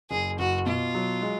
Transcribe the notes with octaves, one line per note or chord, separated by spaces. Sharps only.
F#1 G#4
F#1 F#4
B2 F4
F#3
G#3